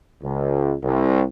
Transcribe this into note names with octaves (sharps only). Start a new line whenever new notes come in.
C#2
C2